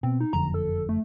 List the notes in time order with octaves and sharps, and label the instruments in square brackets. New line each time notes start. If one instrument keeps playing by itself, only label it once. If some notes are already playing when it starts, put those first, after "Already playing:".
[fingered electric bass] B2 [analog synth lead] C4
[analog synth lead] D#4
[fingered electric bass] F#1 F2 D3 [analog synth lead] A#5
[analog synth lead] A4
A3